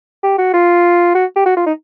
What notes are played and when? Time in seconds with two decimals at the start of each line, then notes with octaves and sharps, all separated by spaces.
0.24 G4
0.38 F#4
0.54 F4
1.15 F#4
1.36 G4
1.46 F#4
1.57 F4
1.67 D#4